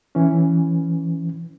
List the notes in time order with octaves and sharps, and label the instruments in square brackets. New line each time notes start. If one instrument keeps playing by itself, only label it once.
[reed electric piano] E3 C#4